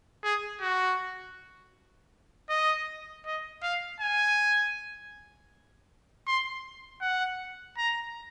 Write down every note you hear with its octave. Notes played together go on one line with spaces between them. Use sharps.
G#4
F#4
D#5
D#5
F5
G#5
C6
F#5
A#5